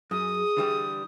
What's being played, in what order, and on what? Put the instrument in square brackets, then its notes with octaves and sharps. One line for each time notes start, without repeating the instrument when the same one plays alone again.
[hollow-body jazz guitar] F#2 [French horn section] G#4 [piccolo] D#6
[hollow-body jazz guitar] D3 E3 G3